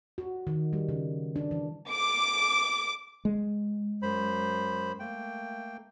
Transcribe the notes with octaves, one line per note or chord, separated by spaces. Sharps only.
F#4
D#3
G3
C#3
D4
E3
D6
G#3
F#2 C5 B5
A3 A#3 G5